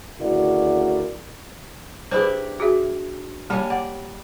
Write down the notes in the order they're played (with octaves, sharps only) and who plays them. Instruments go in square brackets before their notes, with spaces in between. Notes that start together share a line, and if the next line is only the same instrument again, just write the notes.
[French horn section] D2 C#3 E4 F#4 A#4 D5
[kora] D4 E4 G4 [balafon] G#4 B4 C5
[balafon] F#4 G#4 E5
[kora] G3 C#4 [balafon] A#3 A5
[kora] D5 [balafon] F#5